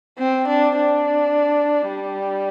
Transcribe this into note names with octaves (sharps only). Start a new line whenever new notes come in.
C4
D4
D4
G3